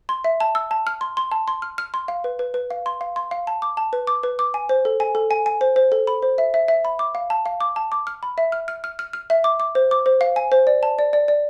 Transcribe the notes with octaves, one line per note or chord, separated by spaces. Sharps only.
C6
E5
A5
E6
A5
F6
C6
C6
A5
C6
F6
F6
C6
F5
B4
B4
B4
F5
C6
F5
C6
F5
A5
D6
A5
B4
D6
B4
D6
G#5
C5
A4
G#5
A4
G#5
G#5
C5
C5
A4
B5
C5
E5
E5
E5
B5
D6
F5
A5
F5
D6
A5
D6
F6
B5
E5
F6
F6
F6
F6
F6
E5
D6
D6
C5
D6
C5
F5
G#5
C5
D5
A5
D5
D5
D5